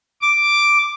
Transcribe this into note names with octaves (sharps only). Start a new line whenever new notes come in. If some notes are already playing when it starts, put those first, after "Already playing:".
D6